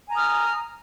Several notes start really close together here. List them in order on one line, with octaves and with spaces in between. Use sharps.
G#5 A#5 D#6 F6